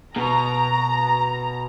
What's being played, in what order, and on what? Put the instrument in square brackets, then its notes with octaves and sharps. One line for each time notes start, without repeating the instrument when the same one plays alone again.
[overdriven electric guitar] B2 [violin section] A#5